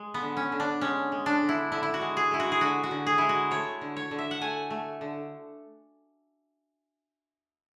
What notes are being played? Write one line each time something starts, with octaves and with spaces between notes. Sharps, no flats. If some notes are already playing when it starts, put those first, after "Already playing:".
Already playing: G#3
B3
D3
C#4
D3
D4
G#3 C#4
G#3
D4
D3
E4
D3 E4
E4
F#4
G#3
G#4
G#3 E4
F#4
G#4
D3 F#4
F#4
D3
G#4
G#3 E4
F#4
A3 C#5
D3
C#5
D3
E5
F#5
A3 G#5
A3
D3